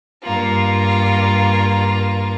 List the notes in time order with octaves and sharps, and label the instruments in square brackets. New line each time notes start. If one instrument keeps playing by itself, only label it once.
[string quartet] G2 A#3 F4